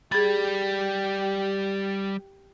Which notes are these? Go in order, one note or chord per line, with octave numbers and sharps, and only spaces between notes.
G3 G4 G#4 B5 A6